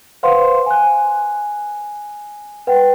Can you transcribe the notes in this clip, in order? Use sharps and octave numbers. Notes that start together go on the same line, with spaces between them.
B4 C5 F5 F#5 C6
G#5 F#6
B4 F#5 G5